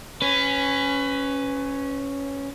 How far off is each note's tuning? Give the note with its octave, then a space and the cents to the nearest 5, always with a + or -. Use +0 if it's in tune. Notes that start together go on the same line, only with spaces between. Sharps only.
C#4 +0 B4 +25